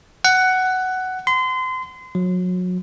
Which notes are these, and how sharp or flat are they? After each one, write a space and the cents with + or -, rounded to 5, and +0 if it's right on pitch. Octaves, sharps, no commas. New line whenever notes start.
F#5 +10
C6 -30
F#3 -30